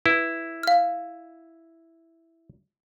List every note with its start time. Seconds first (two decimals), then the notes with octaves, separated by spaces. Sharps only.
0.06 E4 B4
0.63 F5 F6